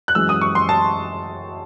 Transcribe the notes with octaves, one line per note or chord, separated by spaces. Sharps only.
F#6
F#2 E3 G#3 E6
D#6
C#6
C6
A5